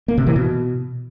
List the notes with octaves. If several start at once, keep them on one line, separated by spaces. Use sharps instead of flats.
A#3
C3
E3
B2